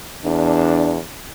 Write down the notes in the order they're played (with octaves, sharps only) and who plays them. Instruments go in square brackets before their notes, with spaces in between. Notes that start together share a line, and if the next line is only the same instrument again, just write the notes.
[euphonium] E2 [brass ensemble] D4